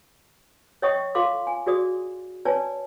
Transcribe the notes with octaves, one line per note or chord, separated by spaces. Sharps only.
C#5 D#5 E5 G5 C#6 D#6
F4 A4 F5 C6 D6
G#5
F#4 G#4 D5 D#6
B4 C#5 D5 G#5 A5